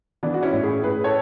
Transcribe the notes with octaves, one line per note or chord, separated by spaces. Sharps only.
E3 B3 D4
F#4
C#4 E4
A2
E4 G#4
A2 G#4 B4
A4 C#5